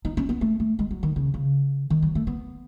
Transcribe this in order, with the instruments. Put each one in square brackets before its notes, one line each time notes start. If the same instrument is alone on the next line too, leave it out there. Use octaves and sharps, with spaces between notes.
[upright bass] D#4
C#4
B3
A3
A3
G#3
F#3
D#3
C#3
C#3
D#3
F#3
A3
B3